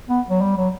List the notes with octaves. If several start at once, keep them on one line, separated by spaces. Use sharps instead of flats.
B3
F#3
G3
F#3